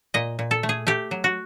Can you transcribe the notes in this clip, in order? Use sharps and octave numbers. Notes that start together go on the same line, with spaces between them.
A#2 D#5
A#2
A4
A3
G#4
A3 G4
F#3
F#4